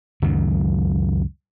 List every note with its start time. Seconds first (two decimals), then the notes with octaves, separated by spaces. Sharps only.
0.22 C#2 F#2 D#3 F#3